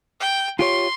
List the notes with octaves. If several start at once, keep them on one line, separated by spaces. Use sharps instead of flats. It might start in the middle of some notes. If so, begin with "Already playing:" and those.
G5
F4 G4 C#5 C6